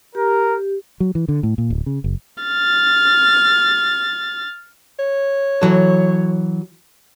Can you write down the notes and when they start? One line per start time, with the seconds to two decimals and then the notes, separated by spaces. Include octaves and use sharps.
0.15 G4 A#4
1.00 F#3
1.15 E3
1.28 D3
1.43 A2
1.58 A#2
1.70 D1
1.86 C#3
2.04 F#1
2.44 F6 A6
4.99 C#5
5.62 E3 F#3 A4